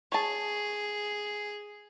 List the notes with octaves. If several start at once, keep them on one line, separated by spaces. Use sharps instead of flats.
G#4 C#5 A5